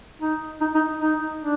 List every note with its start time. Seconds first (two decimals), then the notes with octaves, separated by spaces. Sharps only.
0.21 D#4
0.61 D#4
0.75 D#4
1.01 D#4
1.41 D4